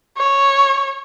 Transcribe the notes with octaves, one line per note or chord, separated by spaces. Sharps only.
C#5